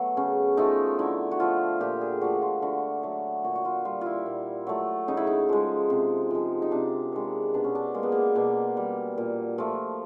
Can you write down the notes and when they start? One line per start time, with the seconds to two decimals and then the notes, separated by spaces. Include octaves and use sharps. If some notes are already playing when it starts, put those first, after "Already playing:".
Already playing: F#3 A3 B3
0.17 C#3 C#4
0.57 F3 A3 D#4
0.99 D3 E4
1.31 F#4
1.40 F3 A3 F4
1.81 A#2 G4
2.01 G#4
2.21 F3 A3 F#4
2.42 F4
2.62 D3 F#4
3.03 F#3 A3
3.44 A#2 F#4
3.55 F#4
3.65 F4
3.85 G3 F4
4.01 E4 F4
4.26 A#2
4.67 F#3 A3
5.08 C#3 D#4
5.17 E4
5.27 D#4
5.49 F3 G#3
5.90 C3
6.31 F3 G#3
6.62 D#4
6.72 C3 D4
7.12 D#3 G#3
7.54 B2 D4
7.64 C#4
7.75 D4
7.94 G#3 A#3
8.03 B3
8.12 A#3
8.35 B2 A#3
8.77 G3
9.18 A#2
9.58 F3 A3